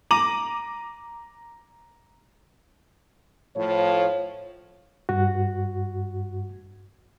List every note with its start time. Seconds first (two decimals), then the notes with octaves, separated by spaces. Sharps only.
0.11 A#5 D6 D#7 F#7
3.55 A2 F3 C#5
5.09 G2 F#4